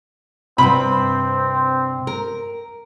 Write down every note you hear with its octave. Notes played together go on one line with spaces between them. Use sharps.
G2 C3 C4 B5
A#4